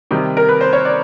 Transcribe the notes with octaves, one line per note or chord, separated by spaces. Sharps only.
C3 D#3 G3
A#4
B4
C5
C#5
D5